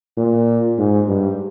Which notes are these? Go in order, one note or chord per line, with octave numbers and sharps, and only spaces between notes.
A#2
G#2
G2